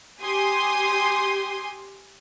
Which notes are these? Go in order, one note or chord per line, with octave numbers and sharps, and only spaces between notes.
G4 G#5 C6 D#6